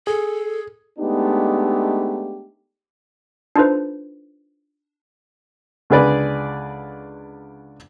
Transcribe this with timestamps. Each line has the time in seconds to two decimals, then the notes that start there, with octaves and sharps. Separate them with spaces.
0.07 G#4 A4
0.99 G#3 A3 B3 D4 D#4 G4
3.56 D4 D#4 F4 A4 B4 C5
5.90 C#2 D3 G#4 B4 D5